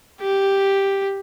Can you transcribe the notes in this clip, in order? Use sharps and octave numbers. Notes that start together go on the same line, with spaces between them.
G4